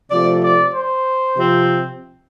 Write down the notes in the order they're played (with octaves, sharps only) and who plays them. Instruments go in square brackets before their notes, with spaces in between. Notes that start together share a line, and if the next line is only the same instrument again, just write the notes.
[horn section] C3 F3 A3 D5
D5
C5
C3 F3 C4